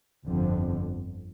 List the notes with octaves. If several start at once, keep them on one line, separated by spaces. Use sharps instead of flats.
G1 F2 D3